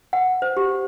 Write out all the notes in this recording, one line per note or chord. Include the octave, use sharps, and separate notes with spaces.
F#5
C5
G4